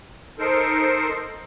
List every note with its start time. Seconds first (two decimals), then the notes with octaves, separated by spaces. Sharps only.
0.39 D#4 A4 A#4 C5